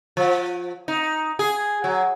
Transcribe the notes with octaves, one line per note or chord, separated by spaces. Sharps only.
F3
D#4
G#4
F#3